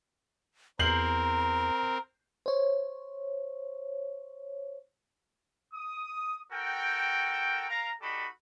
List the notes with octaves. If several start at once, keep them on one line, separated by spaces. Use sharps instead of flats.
E2 C4 A#4 A#5 G6 C7 F#7
C5 C#5
D#6
F#4 A4 A#4 G5
A#4 F5 A#5
G3 D#4 F#4 A4 B5